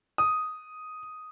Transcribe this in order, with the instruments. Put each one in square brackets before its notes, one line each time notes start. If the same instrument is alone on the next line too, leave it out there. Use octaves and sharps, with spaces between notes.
[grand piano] D#6